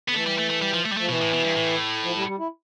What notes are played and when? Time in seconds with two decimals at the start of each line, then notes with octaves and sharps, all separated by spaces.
0.08 D3 B3
0.14 E3 A3
0.26 G3
0.38 A3
0.50 A3
0.62 G3
0.74 F3
0.85 A3
0.92 G3
0.97 F3 A3
1.09 B2 E3
1.21 A2
1.33 B2
1.45 G2
1.56 A2
2.03 F3
2.16 G3
2.28 G3
2.39 E4